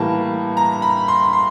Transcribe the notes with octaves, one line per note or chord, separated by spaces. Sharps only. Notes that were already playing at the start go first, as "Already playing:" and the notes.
Already playing: A2 E3 G3 A#3 A5
A#5
B5
C6
C6